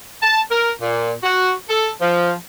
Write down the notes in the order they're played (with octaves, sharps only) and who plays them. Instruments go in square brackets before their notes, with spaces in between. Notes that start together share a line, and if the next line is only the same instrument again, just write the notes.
[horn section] A5
A#4
A#2
F#4
A4
F3